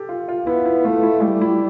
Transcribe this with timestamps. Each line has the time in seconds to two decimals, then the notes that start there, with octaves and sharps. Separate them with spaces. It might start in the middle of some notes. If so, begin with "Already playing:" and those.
Already playing: G4 A4
0.09 F4
0.28 F4
0.47 B3 E4
0.66 E4
0.85 A3 F4
1.03 E4
1.22 G3 E4
1.41 E4